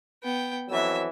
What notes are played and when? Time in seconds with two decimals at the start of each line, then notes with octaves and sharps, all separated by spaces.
0.23 B3 G5
0.70 F2 E3 F#3 E5 E6